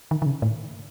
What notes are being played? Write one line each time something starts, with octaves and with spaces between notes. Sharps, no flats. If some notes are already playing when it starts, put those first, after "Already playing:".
D#3
D#3
C#3
A2